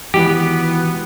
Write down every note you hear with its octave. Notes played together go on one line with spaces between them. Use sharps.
D#3 E3 G#3 B3 E4 F#4 G4